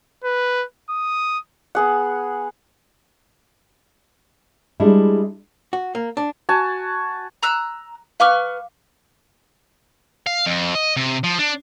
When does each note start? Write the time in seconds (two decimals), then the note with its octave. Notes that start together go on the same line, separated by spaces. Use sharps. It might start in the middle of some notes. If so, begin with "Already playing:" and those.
0.24 B4
0.90 D#6
1.75 B3 G#4 F#5
4.80 G3 G#3 D4 E4
5.73 F#4
5.95 A#3
6.17 D4
6.49 F#4 G#5 A5
7.43 A#5 E6 F#6
8.20 B4 F5 C#6 D6 F6
10.27 F5
10.46 F2
10.75 D#5
10.97 C3
11.24 F3
11.39 D4